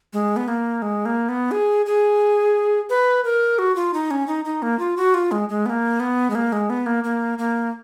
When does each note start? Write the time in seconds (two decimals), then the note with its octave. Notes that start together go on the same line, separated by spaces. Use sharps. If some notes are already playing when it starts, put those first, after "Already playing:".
0.13 G#3
0.36 B3
0.48 A#3
0.82 G#3
1.05 A#3
1.29 B3
1.51 G#4
1.86 G#4
2.89 B4
3.24 A#4
3.58 F#4
3.76 F4
3.94 D#4
4.11 C#4
4.27 D#4
4.45 D#4
4.62 A#3
4.79 F4
4.97 F#4
5.14 F4
5.31 G#3
5.49 G#3
5.66 B3
5.70 A#3
6.00 B3
6.30 G#3
6.35 A#3
6.52 G#3
6.70 B3
6.86 A#3
7.04 A#3
7.38 A#3